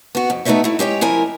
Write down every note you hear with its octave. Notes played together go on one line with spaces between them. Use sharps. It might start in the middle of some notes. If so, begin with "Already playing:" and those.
B3 F#4
F2
A3 B3 D#4 F#4 C#5 E5
A3 E4
G#3 G4 C#5 G5
F3 E4 A#4 G#5